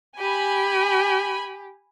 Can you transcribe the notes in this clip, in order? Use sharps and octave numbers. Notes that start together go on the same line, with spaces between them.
G4 G#5 B5